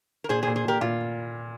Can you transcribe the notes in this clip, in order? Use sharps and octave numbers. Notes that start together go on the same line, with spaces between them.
A#4
A#2 G#4 C5
G#4 C5
A#2
G#4 C5
A#2 G4 A#4
A#2 F4